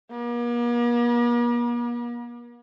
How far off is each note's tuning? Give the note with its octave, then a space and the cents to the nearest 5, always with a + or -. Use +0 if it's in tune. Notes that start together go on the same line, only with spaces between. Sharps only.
A#3 +45